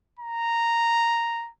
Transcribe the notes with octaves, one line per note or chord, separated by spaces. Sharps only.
A#5